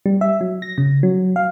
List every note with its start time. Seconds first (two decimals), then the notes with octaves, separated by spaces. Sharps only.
0.06 G3
0.21 E5
0.41 F#3
0.62 A#6
0.78 C#3
1.03 F#3
1.36 F5